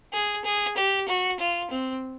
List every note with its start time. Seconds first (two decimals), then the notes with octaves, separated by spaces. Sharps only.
0.13 G#4
0.45 G#4
0.77 G4
1.08 F#4
1.40 F4
1.71 C4